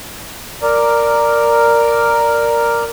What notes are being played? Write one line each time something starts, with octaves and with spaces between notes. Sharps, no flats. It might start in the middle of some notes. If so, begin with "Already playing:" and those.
A#4 D5